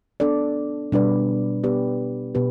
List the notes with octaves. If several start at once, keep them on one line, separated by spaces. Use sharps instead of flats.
B3 D4 A4 D5
B2 G3 D4 B4 D5
B3 G4 B4 D5
B2 B3 G4 B4